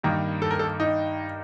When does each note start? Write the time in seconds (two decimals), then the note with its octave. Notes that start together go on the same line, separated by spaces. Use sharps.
0.03 G2 D#3 A#3
0.42 A4
0.51 A#4
0.59 A4
0.80 D#4